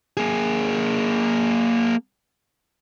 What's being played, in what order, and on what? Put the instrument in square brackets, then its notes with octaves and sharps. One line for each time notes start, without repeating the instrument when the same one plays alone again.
[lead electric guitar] A#3 G#4